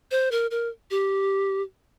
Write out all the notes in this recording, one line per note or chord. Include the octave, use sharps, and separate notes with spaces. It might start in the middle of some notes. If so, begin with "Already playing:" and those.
C5
A#4
A#4
G4